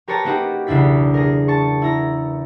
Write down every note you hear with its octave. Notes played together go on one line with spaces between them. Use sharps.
G4 A#4 B4 C#5 A5 A#5
A#3 C#4 D#4 F#4 G4 B4
B1 E2 C#3 D4 E4 B6
G#4 A#4
A5 C#6
E4 A#5